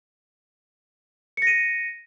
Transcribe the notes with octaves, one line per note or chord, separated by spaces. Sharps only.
A#6 C#7 D#7